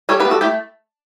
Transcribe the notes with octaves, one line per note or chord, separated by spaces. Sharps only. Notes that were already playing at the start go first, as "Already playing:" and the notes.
G3 A4 C#5
G4 B4
B3
F#4 A4
A3 E4 G4